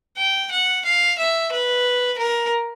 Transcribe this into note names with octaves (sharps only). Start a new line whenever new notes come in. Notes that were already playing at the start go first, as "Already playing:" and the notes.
G5
F#5
F5
E5
B4
A#4